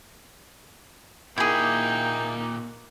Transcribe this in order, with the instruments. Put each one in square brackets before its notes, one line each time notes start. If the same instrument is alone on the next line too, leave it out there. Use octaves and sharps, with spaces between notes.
[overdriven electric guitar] A#2 G4 [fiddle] A#3 D#4 [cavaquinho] E4 G#4 [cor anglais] G5